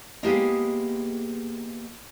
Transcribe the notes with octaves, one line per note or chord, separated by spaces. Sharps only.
G#3 A#3 B3 E4 G4 G#4